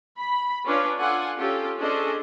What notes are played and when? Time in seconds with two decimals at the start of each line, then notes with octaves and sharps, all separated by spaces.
0.19 B5
0.65 C#4 D4 F4 B4 C#5
0.99 F4 A4 D5 F#5 G#5
1.37 C#4 F4 G4 A4
1.79 C#4 D4 G#4 A4 C5 D#5